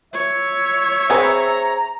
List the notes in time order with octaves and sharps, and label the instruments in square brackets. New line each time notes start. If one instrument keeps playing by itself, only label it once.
[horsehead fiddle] C#5 [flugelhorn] E5
[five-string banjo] C4 G#4 B4 [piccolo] A#5